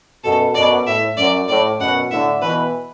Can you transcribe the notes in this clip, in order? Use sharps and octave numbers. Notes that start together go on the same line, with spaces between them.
F#2 B2 A4
F#2 B2 D5
A2 E5
F#2 D5
A2 D5
F#2 B2 F#5
A2 D3 E5
B2 E3 B4